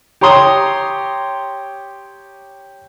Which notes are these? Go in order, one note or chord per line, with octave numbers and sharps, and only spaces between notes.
G4 C#5 A#5 C6 D#6